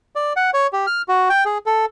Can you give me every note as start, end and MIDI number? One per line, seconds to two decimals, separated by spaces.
0.16 0.33 74
0.36 0.50 78
0.54 0.67 73
0.73 0.86 67
0.87 1.02 89
1.08 1.29 66
1.30 1.44 79
1.45 1.58 68
1.66 1.85 69